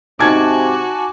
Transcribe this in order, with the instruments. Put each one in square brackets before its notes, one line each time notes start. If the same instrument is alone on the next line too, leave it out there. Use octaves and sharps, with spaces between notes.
[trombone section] G#2 C3 [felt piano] D#4 G#6 [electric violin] F#4 [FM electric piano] G#5 A5 D6